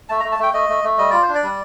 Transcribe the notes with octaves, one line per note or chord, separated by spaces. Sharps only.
A3 A5
A#5
A3
A5
A3 G5
A3 D#5
A3
A3
G3 D#5
F4 D5
C5
D4
D5
G3